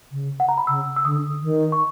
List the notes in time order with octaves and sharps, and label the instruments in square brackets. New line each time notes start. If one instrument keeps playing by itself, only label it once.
[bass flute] C#3
[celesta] F#5
A#5
B5
[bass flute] C#3 [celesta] E6
[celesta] E6
[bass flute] D3 [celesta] D#6
[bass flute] D#3
[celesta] C#6